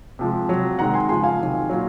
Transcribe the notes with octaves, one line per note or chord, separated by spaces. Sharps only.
C3 F3 G#3
C3 F#3
C3 D#3 G#3 F#5 A#5
G#5 C6
C#3 F3 G#3 G#5 C6
F5 G#5
C3 D#3 F#3
A#2 F#3